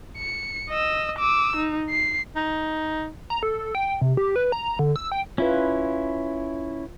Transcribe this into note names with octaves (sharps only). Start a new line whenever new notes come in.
C#7
D#5 E6
D6 E6
D#4
C7
D#4
A#5
A4
G5
C3
G4
B4
A#5
D3
E6
G5
C#4 E4 F4 B4